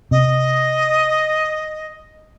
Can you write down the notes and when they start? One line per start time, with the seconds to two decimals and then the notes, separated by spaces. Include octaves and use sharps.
0.11 C3 D#5